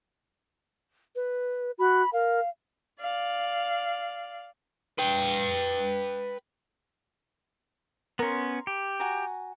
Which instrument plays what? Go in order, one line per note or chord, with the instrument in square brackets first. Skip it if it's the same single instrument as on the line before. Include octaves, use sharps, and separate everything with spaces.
[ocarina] B4
[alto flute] F#4 [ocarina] B5
[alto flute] A#4 [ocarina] F5
[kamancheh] D5 F5
[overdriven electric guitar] B4 G5
[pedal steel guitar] B3 C#4 [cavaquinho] A#4 C6
[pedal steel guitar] G4
[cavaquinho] F#4 G#5 A#5